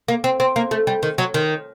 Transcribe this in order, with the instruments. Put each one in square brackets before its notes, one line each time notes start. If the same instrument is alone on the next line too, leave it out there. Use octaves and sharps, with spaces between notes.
[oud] A#3
C4
C4
A#3
A3
G3
D#3
F#3
D#3